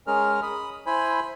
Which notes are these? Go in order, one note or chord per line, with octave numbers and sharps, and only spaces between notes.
G#3 C#4 G#4 A#4 F6
B5 D#6
E4 C5 G#5 B5